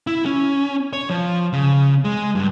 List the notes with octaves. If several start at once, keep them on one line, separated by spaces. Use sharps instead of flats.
E4
C#4
C#5
F3
C#3
G#3
G2